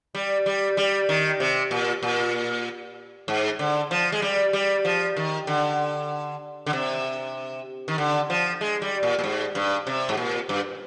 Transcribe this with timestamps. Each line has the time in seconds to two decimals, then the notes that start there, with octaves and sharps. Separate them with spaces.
0.15 G3
0.46 G3
0.77 G3
1.09 D#3
1.40 C3
1.71 A#2
2.03 A#2
3.28 G#2
3.59 D3
3.91 F3
4.12 G#3
4.22 G3
4.53 G3
4.85 F3
5.17 D#3
5.47 D3
6.66 D3
6.73 C3
7.88 D#3
7.98 D3
8.30 F3
8.61 G#3
8.82 G3
9.03 A#2
9.19 A#2
9.24 G#2
9.55 G2
9.87 C3
10.09 G#2
10.17 A#2
10.49 G2